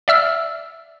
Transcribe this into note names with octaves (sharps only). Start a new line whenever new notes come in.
D5 E5 E6 F6